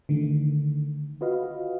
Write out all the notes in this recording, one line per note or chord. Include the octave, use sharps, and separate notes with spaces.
D3 D#3 A3
F4 F#4 B4 D#5 F5